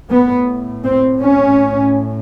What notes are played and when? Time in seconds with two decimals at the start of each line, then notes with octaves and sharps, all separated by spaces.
0.10 A2 B3
0.84 C4
1.21 C#4